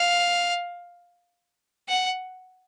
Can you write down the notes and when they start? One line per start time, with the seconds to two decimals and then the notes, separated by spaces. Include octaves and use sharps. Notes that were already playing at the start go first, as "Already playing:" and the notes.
Already playing: F5
1.88 F#5